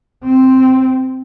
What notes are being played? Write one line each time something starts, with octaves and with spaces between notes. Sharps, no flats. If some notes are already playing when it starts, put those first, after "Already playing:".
C4